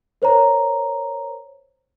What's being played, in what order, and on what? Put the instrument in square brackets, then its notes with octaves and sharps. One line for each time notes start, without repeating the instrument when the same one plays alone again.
[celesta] A#4 C5 C#5 A#5